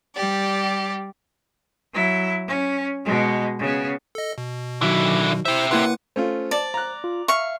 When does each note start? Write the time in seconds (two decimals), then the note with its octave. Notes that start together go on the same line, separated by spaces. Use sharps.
0.16 G3 G4 D5
1.93 F#3 E4
2.47 C#4
3.05 B2 G#3
3.59 C#3 B3
4.15 A4 D#5
4.38 B2
4.81 D3 D#3 F#3 E4
5.45 E4 G4 C5 E5
5.71 A#3 E4 B4 F#5 C6 F#6
6.16 A3 C#4 F4 C5
6.51 D5 A5
6.74 A#5 F#6
7.04 F4
7.28 E5 F5 C#6